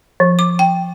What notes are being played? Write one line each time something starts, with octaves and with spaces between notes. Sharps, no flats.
F3
D6
G5